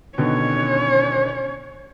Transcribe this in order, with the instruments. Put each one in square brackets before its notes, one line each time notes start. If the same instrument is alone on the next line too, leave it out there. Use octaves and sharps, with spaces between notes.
[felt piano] B2 D3 D#3 [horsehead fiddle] C#4 C#5